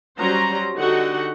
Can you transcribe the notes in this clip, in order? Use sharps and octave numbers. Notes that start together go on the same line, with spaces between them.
F#3 G3 C#4 C5 A#5
D3 D#4 F#4 G4 F#5